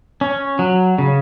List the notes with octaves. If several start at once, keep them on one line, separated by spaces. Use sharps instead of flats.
C#4
F#3
C#3